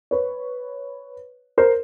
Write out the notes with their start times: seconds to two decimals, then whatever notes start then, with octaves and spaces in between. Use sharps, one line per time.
0.11 B4 C#5
1.58 A#4 C5